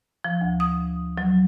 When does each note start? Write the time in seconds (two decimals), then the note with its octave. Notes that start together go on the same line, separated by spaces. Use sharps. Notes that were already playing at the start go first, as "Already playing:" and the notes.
0.24 F3
0.41 D2
0.60 D#6
1.18 F#3